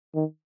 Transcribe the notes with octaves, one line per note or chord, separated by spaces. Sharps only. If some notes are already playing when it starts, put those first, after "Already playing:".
D#3